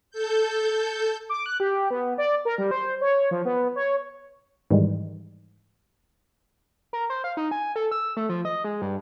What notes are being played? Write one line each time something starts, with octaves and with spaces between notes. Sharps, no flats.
A4 G6
D6
F#6
G4
B3
D5
A#4
G3
C5
C#5
F3
B3
C#5
G#2 D#3 E3 G3 G#3
A#4
C5
F5
D#4
G#5
A4
E6
A3
F3
D#5
G#3
G2